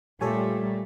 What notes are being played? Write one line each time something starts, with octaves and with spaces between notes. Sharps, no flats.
A#2 G3 A3 G4 A4 C#5 G#5